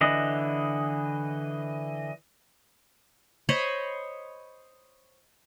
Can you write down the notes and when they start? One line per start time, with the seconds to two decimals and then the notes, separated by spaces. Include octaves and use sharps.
0.01 D3 E3 D#5
3.49 C5 C#5 D#5 B5